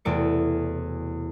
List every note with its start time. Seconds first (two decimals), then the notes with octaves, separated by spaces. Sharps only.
0.05 E1 E2 C3 A3 D5 C#7